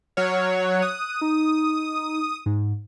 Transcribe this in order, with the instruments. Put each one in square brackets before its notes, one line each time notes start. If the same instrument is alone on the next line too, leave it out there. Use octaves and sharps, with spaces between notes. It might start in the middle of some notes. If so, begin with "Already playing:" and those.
[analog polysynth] F#3 C#5 [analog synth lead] F6
[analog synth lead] F#6
[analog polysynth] D#6
[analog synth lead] D#4
G#2